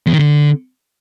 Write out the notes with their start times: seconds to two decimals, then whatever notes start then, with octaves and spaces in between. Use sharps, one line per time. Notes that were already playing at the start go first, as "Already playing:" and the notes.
0.07 E2
0.13 D#3
0.19 D3